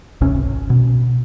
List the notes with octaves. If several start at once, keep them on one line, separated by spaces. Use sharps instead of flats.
G#1 C#2 C3 C#4
B2